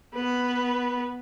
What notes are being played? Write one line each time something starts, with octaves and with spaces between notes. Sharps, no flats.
B3 B4